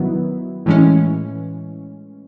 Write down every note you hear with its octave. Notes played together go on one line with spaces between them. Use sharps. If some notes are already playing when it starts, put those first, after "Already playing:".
Already playing: D#3 F#3 B3 E4
A2 E3 G#3 C#4